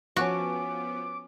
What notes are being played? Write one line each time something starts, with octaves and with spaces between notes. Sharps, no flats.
F3 B3 C#4 F#4 A5 C#6 D6